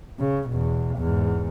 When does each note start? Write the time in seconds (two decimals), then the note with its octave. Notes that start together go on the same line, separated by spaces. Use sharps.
0.19 C#3
0.49 E2 B2
0.97 E2 G#2